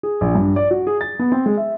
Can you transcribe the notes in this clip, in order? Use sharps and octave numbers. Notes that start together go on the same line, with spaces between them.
G#4
A#1
G2
D5
F#4
G#4
A6
B3
C4
G#3
E5